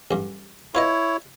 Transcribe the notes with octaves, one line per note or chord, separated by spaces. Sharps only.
A1 G2
E4 F4 B4 C#5 D#5